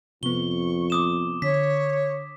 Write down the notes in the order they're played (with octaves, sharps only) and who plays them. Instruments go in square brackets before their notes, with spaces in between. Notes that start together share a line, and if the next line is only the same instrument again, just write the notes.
[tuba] F2 [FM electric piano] C3 B3 [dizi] C#6 [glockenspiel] G7
[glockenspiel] D6 D#6 E7
[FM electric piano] D3 [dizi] C#5 [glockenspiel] B6